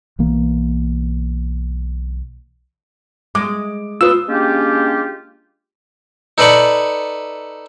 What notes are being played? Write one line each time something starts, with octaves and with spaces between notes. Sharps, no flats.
B1 E3 A#3
G#3 D6
F4 B4 D#6 E6
G#3 A#3 C#4 D4 F4 G4
D#4 A4 B4 D5 B5 C#6